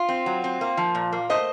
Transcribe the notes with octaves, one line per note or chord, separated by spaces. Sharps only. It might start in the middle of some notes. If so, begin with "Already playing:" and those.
Already playing: F4
C4
F#3
C4
A#3
F3
A#2
A#3
A3 C5 D#5